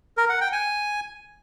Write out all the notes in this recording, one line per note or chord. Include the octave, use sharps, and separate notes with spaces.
A#4
F#5
G5
G#5